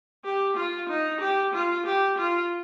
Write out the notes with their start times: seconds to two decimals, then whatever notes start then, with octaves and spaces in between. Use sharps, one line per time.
0.25 G4
0.57 F4
0.89 D#4
1.21 G4
1.54 F4
1.86 G4
2.18 F4